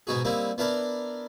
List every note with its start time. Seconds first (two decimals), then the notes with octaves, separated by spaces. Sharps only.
0.07 G#2 B2 D#4 F#4 G#4
0.25 G3 A#3 C4 D#4 E4
0.58 B3 D4 E4 A#4 D5